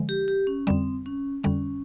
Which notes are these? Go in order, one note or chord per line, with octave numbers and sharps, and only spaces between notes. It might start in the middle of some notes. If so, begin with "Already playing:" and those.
Already playing: D3 F3 G#3
G4
G4
C#4
F2 D3 G3 C4
C#4
F2 D3 G3 C#4